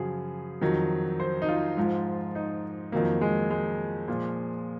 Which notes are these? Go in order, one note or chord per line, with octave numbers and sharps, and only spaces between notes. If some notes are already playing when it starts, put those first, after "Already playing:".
Already playing: F#2 C#3 F3 F#4 G#4
F2 D#3 F#3
C5
D#4
F4
G#2 F3
D#4
F2 D#3 F#3 A#3
G#3
G#3
A#2 F3